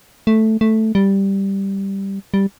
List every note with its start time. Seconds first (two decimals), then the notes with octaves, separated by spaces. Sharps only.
0.27 A3
0.61 A3
0.95 G3
2.34 G3